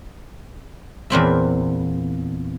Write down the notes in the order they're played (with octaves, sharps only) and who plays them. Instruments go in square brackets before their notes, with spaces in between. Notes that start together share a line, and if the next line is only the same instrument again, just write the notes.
[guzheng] E2 A#2 C4 E5